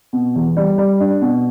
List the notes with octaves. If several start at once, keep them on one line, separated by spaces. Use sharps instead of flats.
B2
E2
G3
G3
D4
B2